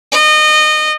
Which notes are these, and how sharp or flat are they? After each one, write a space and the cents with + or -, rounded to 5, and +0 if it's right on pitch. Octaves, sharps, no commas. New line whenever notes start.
D#5 -25